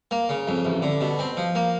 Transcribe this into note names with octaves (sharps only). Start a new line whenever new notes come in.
A#3
C#3
F2
A1
D3
B2
C4
F3
A#3